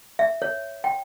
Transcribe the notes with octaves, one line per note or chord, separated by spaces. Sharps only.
E5
C#5
G5